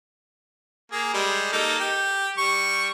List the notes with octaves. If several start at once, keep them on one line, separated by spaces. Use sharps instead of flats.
A#3 G#4
G3 G#3
A#3 D#4 A4
G4
G3 C#6